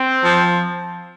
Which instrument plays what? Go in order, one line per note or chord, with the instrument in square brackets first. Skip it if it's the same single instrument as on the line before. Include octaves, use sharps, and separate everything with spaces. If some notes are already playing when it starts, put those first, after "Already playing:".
Already playing: [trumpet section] C4
[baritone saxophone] F3